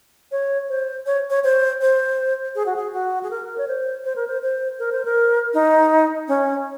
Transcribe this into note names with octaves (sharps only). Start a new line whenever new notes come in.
C#5
C5
C#5
C#5
C5
C5
G#4
F#4
G#4
F#4
G#4
A#4
C#5
C5
C5
A#4
C5
C5
A#4
C5
A#4
D#4
C#4